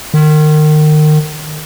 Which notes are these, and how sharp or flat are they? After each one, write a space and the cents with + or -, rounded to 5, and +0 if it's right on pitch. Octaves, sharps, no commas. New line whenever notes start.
D#3 -30